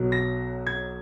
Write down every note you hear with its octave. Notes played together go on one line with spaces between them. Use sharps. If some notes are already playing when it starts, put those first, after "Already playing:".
Already playing: B1 B2 F#3
A#6
G#6